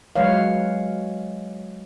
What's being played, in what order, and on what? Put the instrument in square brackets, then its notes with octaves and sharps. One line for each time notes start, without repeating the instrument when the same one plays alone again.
[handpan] F#3 G#3 B4 C#5 F5